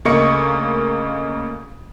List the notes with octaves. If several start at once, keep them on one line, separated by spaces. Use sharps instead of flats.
D2 C#3 A#3 D#5 C#6 C#7